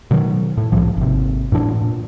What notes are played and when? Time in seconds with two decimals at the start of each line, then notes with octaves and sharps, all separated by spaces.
0.11 B2 D#3 F#3
0.57 A2
0.72 C2 G#2 E3 F3
0.97 G#1 C3
1.52 F#2 A2 E3 D4
1.82 A#2